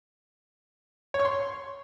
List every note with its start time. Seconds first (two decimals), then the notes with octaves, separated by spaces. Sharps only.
1.14 C#5
1.20 C#6
1.25 C6